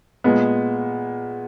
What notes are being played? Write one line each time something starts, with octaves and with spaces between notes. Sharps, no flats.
A#2 G#3 B3